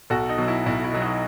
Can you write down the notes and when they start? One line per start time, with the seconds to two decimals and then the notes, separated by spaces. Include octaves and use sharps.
0.10 B1 F#4 A4
0.29 D#4
0.38 B2 F#3
0.48 E4
0.66 B1 E4
0.84 E4
0.93 B2 F#3
1.02 D#4 F#4